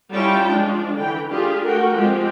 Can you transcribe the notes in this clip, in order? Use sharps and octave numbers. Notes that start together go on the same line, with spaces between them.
G3 C#4 E4 F4 G5 A5
F3 G#3 D4
D3 E3 G5
A3 D4 F4 G4 G#4
A3 F#4 A#4 F#5 G5
F3 G#3 C4 G4